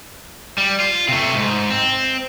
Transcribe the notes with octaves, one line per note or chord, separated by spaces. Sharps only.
G3
F4
C3 A3
G#2
C4